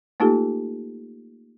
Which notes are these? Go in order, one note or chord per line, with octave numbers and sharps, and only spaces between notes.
A3 A#3 D#4 F4 G4 A4